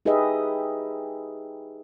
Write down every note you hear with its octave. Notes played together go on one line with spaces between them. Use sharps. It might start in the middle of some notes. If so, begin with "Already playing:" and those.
D#4 G4 G#4 B4 D#5 E5